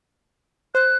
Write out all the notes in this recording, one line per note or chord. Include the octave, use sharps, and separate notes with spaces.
C5 F#6